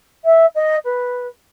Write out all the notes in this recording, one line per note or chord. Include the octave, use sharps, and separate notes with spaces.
E5
D#5
B4